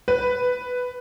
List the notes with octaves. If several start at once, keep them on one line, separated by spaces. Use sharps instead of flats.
B4